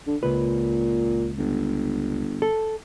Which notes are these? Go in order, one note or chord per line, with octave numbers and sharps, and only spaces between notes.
D3
C#2 A#2 B4
G1
A4